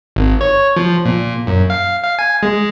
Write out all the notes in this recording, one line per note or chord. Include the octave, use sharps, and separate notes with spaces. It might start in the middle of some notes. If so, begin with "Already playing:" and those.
G#1
C#5
F3
A#2
F#2
F5
F5
G#5
G#3